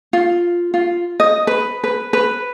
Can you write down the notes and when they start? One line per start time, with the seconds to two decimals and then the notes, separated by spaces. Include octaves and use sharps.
0.13 F4
0.74 F4
1.20 D#5
1.47 B4
1.84 B4
2.13 B4